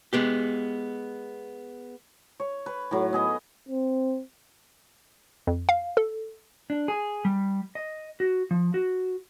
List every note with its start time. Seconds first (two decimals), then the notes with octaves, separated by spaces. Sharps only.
0.13 G#3 B3 G4
2.40 C#5
2.66 B4
2.91 A2 F#3
3.13 B3 G#4 D#5
3.69 C4
5.47 F2
5.69 F5
5.97 A4
6.70 D4
6.88 G#4
7.25 G3
7.75 D#5
8.20 F#4
8.51 F3
8.74 F#4